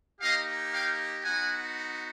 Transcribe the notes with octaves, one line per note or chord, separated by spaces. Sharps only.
A#3 D#4 G4 D#5 F5
F5 G5
B3 D#4 F#4 F#5 G#5